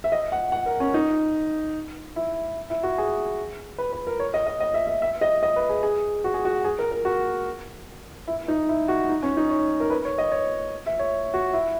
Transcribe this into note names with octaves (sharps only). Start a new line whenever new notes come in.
E5
D#5
F#5
F#5
A#4
C#4
D#4
E4
E4
F#4
G#4
B4
B4
A#4
C#5
D#5
D#5
D#5
E5
E5
E5
D#5
D#5
B4
G#4
G#4
F#4
G#4
F#4
G#4
A#4
A#4
F#4
E4
D#4
E4
F#4
D#4
C#4
D#4
C#5
A#4
B4
C#5
D#5
C#5
E5
C#5
F#4
E4